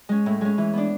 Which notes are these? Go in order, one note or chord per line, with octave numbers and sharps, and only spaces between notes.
G#3 C#4
A2
G#3 C#4
E3
B3 D4